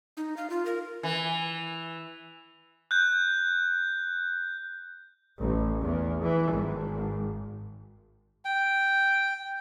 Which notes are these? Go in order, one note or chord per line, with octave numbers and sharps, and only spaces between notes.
D#4
F5
F4
A#4
E3
F#6 G6
A1
E2
E3
G#1
G5